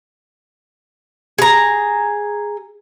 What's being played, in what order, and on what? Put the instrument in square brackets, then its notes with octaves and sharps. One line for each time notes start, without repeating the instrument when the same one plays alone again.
[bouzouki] G#4 A#5